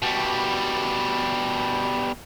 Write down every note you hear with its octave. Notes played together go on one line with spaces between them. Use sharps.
B2 G3